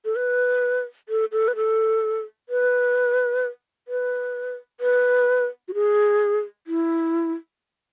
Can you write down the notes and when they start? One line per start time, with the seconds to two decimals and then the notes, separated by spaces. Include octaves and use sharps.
0.05 A4
0.16 B4
1.09 A4
1.32 A4
1.48 B4
1.56 A4
2.49 B4
3.88 B4
4.80 B4
5.68 F#4
5.74 G#4
6.67 E4